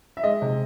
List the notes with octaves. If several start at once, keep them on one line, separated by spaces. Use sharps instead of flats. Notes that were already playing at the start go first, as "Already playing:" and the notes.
E5
G#3 D#5
C3